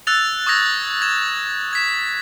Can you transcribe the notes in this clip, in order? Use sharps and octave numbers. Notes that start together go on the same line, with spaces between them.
E6 F#6 A6 F7
C#6 D#6 E6 G#6 A#6 F7
G#6 E7
G#6 B6 E7